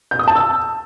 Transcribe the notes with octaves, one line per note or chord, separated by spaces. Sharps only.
G6
D#6
A5
E6